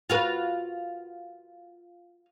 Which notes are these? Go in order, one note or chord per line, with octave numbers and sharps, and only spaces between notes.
F4 F#4 B4